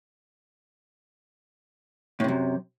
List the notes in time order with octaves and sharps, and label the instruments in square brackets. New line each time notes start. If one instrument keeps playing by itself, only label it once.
[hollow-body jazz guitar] A2
C3
F#2